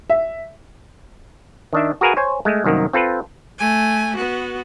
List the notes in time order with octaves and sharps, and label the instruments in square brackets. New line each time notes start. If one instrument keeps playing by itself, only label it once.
[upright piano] E5
[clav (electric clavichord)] D#3 D4 E5
F#4 G#4 A#4 B4 F5 G#5
C5 C#5 G#5
G#3 A3
C2 F#2 D#3 A#3
C4 F4 A4 B4
[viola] A3 G#5
B3 F#4